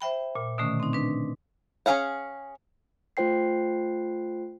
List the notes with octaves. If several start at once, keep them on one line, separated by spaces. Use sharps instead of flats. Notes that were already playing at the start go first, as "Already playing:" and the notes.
C5 E5 G5 B5
A#2
B2 D3 D#3 A3 C#4
C4 D#4
D4 B4
C#4 D#4 G#4 F5 F#5
A3 F4 C5 G5 C7